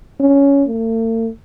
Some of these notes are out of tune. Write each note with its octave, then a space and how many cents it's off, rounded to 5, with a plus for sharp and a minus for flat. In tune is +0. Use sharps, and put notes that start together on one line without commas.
C#4 +10
A3 +45